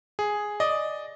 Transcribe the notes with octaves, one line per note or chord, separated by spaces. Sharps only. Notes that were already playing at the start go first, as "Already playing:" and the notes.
G#4
D5 D#5